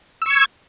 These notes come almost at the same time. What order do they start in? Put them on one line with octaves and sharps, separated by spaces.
E6 C#6 G#6